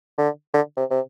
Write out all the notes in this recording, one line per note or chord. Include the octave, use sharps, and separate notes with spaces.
D3
D3
C3
C3